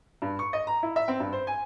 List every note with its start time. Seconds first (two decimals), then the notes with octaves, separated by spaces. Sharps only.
0.22 G2
0.39 C#6
0.53 D#5
0.67 A#5
0.83 E4
0.96 E5
1.08 C4
1.20 G2
1.33 C5
1.47 G#5